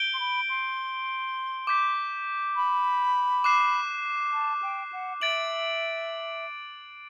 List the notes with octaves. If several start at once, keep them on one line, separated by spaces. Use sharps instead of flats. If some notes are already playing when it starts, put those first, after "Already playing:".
Already playing: G6 D7 G7
C6
B5
C6
D6 G6 B6
B5
D6 F#6 C7 E7
A5
G5
F#5
E5 A6 D7 F#7